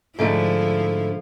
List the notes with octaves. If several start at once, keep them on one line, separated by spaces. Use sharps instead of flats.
G#2 D3 F3 A3 E4